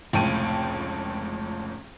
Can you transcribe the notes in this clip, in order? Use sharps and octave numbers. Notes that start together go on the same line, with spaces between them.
F1 C#2 A2 G5 A5 D#7